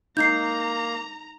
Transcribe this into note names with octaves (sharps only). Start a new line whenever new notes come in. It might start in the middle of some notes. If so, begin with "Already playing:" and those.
A#3 D#4 A#5 G6 C7